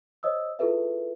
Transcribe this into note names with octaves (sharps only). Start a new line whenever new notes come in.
C5 C#5 D#5 D#6 E6
E4 F4 G#4 A4 B4 E5